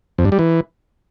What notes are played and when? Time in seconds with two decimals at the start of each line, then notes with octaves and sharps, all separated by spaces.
0.18 F2
0.25 G2
0.32 G3
0.39 E3